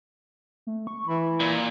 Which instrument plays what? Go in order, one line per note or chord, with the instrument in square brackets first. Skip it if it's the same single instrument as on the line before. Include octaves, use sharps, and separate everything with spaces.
[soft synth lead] A3
C#6
[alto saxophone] E3 [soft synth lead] B5
[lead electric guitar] A#2
[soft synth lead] D5